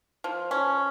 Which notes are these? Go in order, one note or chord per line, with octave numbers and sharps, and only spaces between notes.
F3
C#4